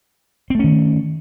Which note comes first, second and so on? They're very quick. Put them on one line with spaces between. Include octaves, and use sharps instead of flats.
C4 A3 C#4 D#3